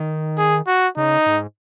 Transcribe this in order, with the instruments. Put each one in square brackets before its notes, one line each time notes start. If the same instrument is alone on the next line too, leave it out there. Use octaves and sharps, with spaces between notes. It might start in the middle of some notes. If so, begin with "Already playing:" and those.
Already playing: [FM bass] D#3
[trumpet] G#4
F#4
[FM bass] C#3 [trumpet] D#4
[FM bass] G#2